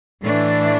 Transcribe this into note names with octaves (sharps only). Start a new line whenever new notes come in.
A2 E3 A3 D4